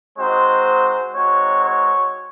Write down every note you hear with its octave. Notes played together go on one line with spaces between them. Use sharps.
G#3 C4 D#4 F#4 C5
G#3 C4 D#4 F#4 C#5
C#5